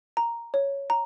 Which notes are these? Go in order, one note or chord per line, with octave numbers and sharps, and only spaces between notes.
A#5
C#5
A#5